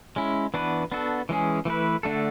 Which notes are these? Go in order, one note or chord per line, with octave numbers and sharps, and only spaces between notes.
G#3 C#4 E4
E3 B3 D4 F#4 B4
B3 D4 F#4 A4
E3 G#3 C#4 G#4
E3 A3 E4 B4
D3 A3 D4 F#4 A4